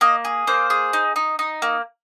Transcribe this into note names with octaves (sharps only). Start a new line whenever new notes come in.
A#3 D#5
G#4
A#3 C5
G#4
D#4
D#4
D#4
A#3